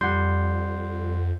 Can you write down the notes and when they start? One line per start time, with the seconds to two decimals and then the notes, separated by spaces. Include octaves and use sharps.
0.01 F2 G3 F#5 C6 G6